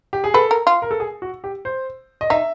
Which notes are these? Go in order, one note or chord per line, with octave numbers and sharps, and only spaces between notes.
G4
G#4
A4 B4
A#4
F4
A#4
A4
G#4
F#4
G4
C5
D#5
D#4 E5